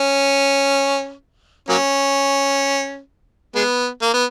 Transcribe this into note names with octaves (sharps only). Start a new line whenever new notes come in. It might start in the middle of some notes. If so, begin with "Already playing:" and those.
Already playing: C#4
F#3 A#3 C#4
G#3 B3
A#3
B3